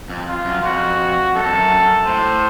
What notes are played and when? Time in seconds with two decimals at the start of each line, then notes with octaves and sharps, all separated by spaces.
0.09 F2
0.28 F4
0.45 F#2
0.63 F2 F#4
1.35 F#2 A4
1.43 F2
1.53 F#2
2.07 A2 C5